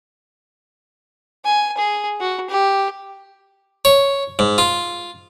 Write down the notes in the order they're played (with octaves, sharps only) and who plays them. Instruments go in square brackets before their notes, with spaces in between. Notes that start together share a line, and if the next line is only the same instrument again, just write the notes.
[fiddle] G#5
G#4
F#4
G4
[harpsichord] C#5
G#2
F4